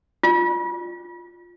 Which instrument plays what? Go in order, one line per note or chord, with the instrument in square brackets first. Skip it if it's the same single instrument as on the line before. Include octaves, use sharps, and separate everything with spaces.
[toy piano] F4